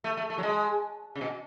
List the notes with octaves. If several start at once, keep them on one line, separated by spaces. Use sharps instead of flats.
A3
A3
A3
F#3
G#3
C#3
B2